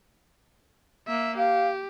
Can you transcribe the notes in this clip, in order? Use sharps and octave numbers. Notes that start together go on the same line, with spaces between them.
A#3 E5
G4 F5